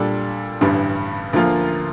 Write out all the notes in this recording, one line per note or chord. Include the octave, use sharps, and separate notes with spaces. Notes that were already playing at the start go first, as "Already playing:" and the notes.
Already playing: A#2 G3 D4 A4
A1 G2 D3 G3
D2 D3 F3 A#3 F4